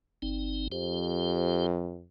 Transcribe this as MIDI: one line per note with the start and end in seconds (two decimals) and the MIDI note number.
0.22 0.68 31
0.22 0.68 60
0.22 0.68 63
0.72 2.07 41
0.72 1.66 67
0.72 1.66 72